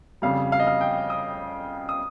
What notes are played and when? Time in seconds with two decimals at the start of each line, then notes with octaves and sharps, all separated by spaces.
0.22 F2 C#3 G3 F5
0.52 F5
0.60 D#5
0.67 F5
0.81 G5
1.10 D#6
1.89 D#6